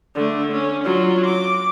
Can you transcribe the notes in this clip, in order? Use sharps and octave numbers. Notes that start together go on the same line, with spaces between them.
D3 A3
C#4
F#3 F4
D6